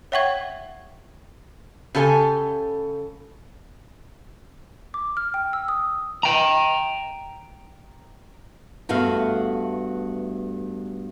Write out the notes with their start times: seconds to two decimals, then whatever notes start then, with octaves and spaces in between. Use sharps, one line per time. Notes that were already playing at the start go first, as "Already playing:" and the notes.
0.12 C#5 E5 F#5 G5 C#6 G#6
1.95 C#3 G4 A4 D5 G#5
4.94 D6
5.17 F6
5.34 G5
5.53 E6
5.68 D#6
6.23 G5 A#5
8.89 G2 A3 B3 F#4 E5 F5